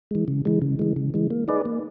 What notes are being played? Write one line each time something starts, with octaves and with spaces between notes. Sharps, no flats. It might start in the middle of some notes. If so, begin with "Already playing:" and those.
E3 G#3
C#3
E3 G#3
C#3
E3 G#3
C#3
E3 G#3
A#3
D#4 G#4 B4 D5
A#3